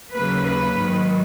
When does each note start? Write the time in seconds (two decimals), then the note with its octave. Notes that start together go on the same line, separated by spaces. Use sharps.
0.13 D#2 C#3 F#3 A#3 B4
0.44 B4
0.75 G#2 D#3 F#3